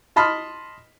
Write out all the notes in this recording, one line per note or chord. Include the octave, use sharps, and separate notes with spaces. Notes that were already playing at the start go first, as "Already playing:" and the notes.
D#5 A5 B5 C6 D#6 F6